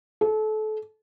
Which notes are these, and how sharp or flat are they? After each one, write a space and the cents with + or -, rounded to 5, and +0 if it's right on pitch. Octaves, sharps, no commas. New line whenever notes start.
A4 -30